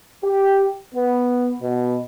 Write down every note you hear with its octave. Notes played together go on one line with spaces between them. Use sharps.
G4
B3
B2